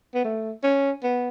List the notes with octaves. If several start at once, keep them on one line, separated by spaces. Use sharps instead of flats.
B3
A3
C#4
B3